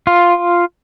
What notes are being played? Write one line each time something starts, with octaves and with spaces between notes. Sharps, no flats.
F4